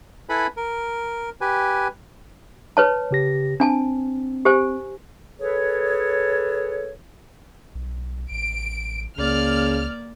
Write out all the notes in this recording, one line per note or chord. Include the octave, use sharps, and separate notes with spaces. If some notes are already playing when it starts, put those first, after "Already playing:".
E4 A4 B4 G#5 B5
A#4
G4 B4 G#5
B4 C#5 A5
C#3 G4 A#6
C4 D4 G#5 A5
G4 C5 G#5
G#4 A4 B4 C#5
B1
A1 D7
C#2 C#3 A#3 D5 F6